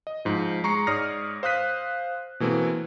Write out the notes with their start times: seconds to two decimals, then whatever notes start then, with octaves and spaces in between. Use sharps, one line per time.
0.07 D#5
0.25 G#2 F3
0.64 G#3 A#5 C#6 C7 C#7
0.87 G#2 C#5 D5 D#6 F6 A#6
1.43 C5 F5 D#6 F#6 B6 D#7
2.40 B2 E3 A3 A#3 C4